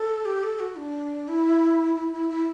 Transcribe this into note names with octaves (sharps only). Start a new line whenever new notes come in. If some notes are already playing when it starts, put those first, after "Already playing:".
Already playing: A4
G4
A4
F#4
D4
E4
E4
E4
E4